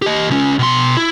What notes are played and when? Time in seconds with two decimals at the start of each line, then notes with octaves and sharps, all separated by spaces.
0.02 G4 D#5
0.30 C#2 C#4
0.59 B2 C6
0.97 E4